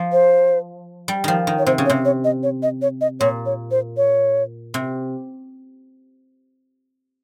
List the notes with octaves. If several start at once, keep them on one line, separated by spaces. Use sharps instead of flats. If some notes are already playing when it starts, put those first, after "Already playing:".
Already playing: F3
C5
G3
D#3 F3
D#3
C#5
C3 C5
C#3
C#5
C3
C#5
D#5
C#5
D#5
C#5
D#5
A#2 C#5
C#5
C5
C#5
C3